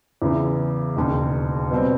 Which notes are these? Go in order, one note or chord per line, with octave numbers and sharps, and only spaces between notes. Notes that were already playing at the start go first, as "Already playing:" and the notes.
E2 C#3 E3
E1 D#2 C#3
B2 G3 C4